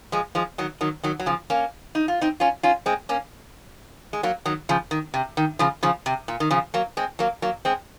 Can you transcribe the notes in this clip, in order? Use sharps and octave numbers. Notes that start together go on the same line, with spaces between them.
F3 G#3
F3 G#3
D#3 F#3
D#3 F#3
D#3 F#3
F#3
C#3 F3
A#3 C#4
D#4
F4
C4 D#4
C#4 F4
C#4 F4
G#3 C4
A#3 C#4
G#3
F#3 A#3
D#3 F#3
C#3 F3
D#3
C3
D#3
C#3 F3
C#3 F3
C3
A#2
D#3
C#3 F3
F#3 A#3
G#3 C4
F#3 A#3
F#3 A#3
G#3 C4